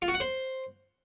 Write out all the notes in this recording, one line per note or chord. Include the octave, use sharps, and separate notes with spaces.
F4
F#4
F#5
C5